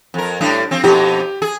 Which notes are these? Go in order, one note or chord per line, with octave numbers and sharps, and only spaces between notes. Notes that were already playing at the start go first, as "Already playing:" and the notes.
F2 A#4
A2 G3 D4
F3 C4
F2 B2 D#4 G4
G#4